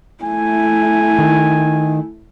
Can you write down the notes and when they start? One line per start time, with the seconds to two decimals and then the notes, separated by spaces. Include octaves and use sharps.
0.24 A3 E4 G#5
1.19 D#3